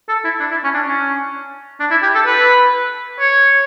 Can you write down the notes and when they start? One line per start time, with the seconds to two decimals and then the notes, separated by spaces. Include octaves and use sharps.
0.09 A4
0.24 E4
0.40 D4
0.51 E4
0.64 C#4
0.74 D4
0.87 C#4
1.80 D4
1.91 E4
2.03 G4
2.15 A4
2.26 B4
3.20 C#5